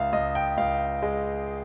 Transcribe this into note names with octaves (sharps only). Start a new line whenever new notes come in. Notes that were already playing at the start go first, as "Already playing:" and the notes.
Already playing: C#2 E5 F5
C#2 D#5
G5
C#2 F5
G#3